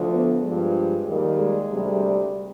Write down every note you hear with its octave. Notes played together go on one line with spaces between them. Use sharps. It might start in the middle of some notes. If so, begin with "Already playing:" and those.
Already playing: D2 D3 F3
B3
G2 F3 G#3
D#2 D#3 G3
G#3
D2 C3 G3